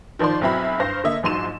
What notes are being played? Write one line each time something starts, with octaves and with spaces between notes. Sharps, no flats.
D#3 F3 C5 D5 C6
B1 F#3 C4 E4 B5
G2 C5 F5 A#6
D3 A#3 D#5 E5
A#1 G#2 F#3 C6 D#7 E7